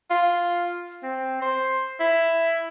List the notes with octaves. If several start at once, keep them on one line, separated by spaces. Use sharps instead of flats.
F4
C4
C5
E4